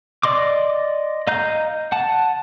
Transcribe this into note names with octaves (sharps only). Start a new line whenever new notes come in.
D5 D#5 C6 D6
D#5 F5 A#5 G6
F#5 A5